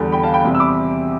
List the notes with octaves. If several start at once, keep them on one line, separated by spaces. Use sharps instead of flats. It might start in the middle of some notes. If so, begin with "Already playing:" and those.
Already playing: E2 D3 G3
G5 B5
F5 A5
G5 B5
E2 C3 G3
E6
B5 D6